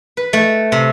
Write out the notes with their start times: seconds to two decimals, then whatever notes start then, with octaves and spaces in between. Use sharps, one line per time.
0.17 B4
0.33 A3
0.72 C3